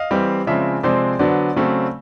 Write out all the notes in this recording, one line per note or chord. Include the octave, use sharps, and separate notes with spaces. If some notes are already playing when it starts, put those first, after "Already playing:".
Already playing: D#5 F5
E3 G3 C4
C#3 F3 G#3 C4 D5 E5
C3 F3 G#3 C4 C5 D5
D3 F#3 B3 D4 C5 D5
C#3 F#3 A3 C4